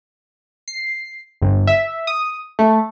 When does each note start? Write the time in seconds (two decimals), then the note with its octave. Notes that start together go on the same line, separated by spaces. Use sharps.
0.68 C7
1.42 G1
1.67 E5
2.07 D#6
2.59 A3